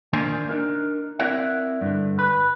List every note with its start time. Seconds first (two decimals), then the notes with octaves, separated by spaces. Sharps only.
0.13 D#3 A#3 D4 F4 C5 G#5
0.49 D4 D#4 A#4
1.19 C4 E4 A#4 D5 E5 F#5
1.81 G2 D3
2.19 B4